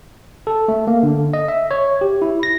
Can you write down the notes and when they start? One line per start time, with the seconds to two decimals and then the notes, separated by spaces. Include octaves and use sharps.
0.47 A4
0.68 A3
0.87 A#3
1.03 D3
1.33 D#5
1.48 E5
1.71 C#5
2.01 G4
2.22 E4
2.43 A#6